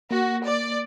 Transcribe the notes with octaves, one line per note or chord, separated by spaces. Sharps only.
A#3 F#4
D5